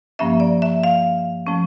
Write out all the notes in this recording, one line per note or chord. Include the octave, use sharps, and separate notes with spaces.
G2 F3 A#3 C#4 E5
D5
E5
F5
F3 A3 C#4